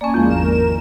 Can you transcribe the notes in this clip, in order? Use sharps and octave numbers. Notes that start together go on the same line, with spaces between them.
A#3 C#4 D5 G#5 A5
E2 F3 G#3 A#3 F4
G#1 A#4 E7